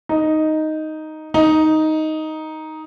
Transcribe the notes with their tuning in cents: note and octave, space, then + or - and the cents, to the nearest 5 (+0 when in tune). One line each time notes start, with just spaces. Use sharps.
D#4 +0
D#4 +5